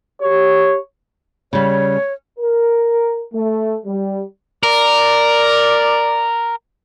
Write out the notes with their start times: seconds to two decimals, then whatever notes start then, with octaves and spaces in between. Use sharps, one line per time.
0.21 G4 C#5
1.53 C#3 G3 C#5
2.39 A#4
3.34 A3
3.86 G3
4.63 A#4 D5